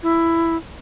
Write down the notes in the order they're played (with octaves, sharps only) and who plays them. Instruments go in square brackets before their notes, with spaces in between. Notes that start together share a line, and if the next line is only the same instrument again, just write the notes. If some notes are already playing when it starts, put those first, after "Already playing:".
[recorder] E4